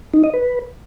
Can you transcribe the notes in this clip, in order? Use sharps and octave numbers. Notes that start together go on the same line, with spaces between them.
D#4
D#5
B4